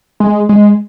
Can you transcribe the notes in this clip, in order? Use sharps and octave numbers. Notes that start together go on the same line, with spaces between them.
G#3
G#3